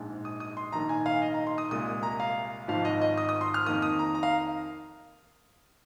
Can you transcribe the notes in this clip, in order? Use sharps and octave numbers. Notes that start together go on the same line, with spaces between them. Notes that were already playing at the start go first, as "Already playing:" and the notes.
Already playing: A#1 G#2 G#3
D#6
D#6
C6
A#1 G#2 D#3 A#5
G#5
F5
D#5
A#5
C6
D#6
C2 A#2 G#3 D#6
A#5
F5
G#1 G#2 F3 F5
D#5
D#5
D#6
D#6
C6
F6
F2 D#3 A#3 D#6
D#6
A#5
A#5
F5